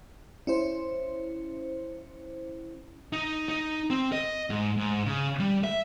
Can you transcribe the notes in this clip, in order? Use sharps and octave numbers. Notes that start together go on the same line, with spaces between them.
C#4 E4 C5
D#4
D#4
C4
D#5
G#2
G#2
C#3
G3
E5